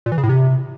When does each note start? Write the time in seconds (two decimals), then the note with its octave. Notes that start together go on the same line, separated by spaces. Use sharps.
0.06 A#2
0.12 E3
0.18 C#3
0.23 A2
0.29 C3